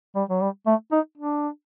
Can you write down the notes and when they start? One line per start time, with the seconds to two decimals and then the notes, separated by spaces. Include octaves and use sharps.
0.16 G3
0.30 F#3
0.41 G3
0.67 A3
0.92 D#4
1.18 D4